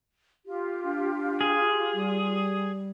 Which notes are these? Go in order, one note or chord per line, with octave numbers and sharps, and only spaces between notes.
F4 G4
D4
G#4
G3